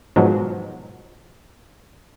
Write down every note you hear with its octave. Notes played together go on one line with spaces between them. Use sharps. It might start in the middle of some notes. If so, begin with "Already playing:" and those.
G#2 B2 D#3 F3 F#3